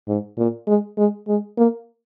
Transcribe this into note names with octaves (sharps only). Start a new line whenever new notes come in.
G#2
A#2
G#3
G#3
G#3
A#3